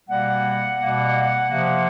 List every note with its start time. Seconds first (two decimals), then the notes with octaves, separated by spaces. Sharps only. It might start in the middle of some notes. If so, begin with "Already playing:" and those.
0.09 B2 G3 A#3 F#5
0.79 B2 G3 A#3
1.49 C3 F3 A#3